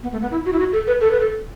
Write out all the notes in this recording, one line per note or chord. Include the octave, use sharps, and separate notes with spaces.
B3
A3
B3
E4
F#4
E4
F#4
A4
B4
A4
B4
A4